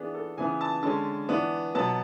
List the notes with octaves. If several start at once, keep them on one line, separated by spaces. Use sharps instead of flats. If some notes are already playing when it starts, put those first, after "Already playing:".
Already playing: E3 B3 D4 G#4
A4
C#3 E3 B3 G#5
A5
D3 G#3 C#4 A5
E3 B3 D4
B2 F#3 B3 A5